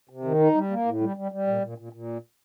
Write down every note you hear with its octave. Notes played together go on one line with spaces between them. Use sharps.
C3
D#3
D#4
G3
A#3
A2
G3
G3
G3
A#2
A#2
A#2
A#2